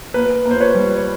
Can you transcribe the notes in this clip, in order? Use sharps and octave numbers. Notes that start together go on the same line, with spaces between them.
A#3 B4
A#3
C5
B4 C#5
G3
C#5